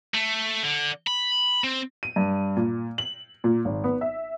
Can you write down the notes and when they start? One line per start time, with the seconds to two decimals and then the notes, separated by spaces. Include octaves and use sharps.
0.14 A3
0.64 D3
1.07 B5
1.64 C4
2.03 D#7
2.16 G2
2.56 A#2
2.98 F#7
3.44 A#2
3.65 G#1
3.84 B3
4.01 E5